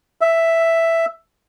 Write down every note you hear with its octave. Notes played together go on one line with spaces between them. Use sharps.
E5